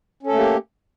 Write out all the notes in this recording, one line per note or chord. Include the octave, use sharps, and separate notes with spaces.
A3 A#3 C#4 G4 A4